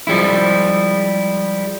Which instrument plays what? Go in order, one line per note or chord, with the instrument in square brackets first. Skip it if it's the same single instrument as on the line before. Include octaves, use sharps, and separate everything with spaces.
[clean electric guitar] F3 G3 G#3 E4